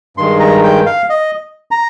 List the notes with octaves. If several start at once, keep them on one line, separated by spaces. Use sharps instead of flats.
G2 D#3 G#3 C6
A#5
G5
F5
D#5
A#5